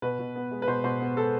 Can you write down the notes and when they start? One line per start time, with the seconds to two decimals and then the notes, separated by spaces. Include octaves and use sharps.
0.02 B2 B4
0.19 B2
0.36 B3
0.51 G#3
0.62 B4
0.68 B2 C5
0.84 B2 C5
1.00 B3
1.17 G#3 A4